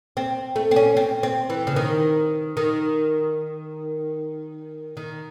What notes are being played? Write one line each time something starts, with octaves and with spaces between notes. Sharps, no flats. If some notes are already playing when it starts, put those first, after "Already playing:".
C4
A3
C4
C#4
C4
C4
E3
C#3
D#3
D#3
D#3